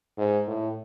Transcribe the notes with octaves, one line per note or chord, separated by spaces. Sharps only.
G#2
A2